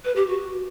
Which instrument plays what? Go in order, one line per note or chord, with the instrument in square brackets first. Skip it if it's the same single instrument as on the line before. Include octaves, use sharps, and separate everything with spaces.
[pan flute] B4
G4
F#4